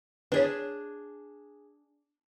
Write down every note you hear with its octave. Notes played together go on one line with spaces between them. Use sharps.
D4 G#4 B4 C#5